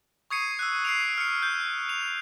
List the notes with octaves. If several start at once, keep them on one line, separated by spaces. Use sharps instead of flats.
C#6 D#6 G#6 C7 C#7 D#7
E6 F#6
C7 D7 F7
F6 C#7
G6
F7